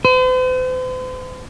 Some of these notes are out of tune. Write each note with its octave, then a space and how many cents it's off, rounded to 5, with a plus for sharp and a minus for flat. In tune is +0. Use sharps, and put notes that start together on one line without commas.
C5 -45